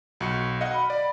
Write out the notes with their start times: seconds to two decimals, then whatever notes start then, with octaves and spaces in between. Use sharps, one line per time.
0.20 B1 F#4 C#7
0.61 D#5 F5 F#5
0.74 B5
0.90 D5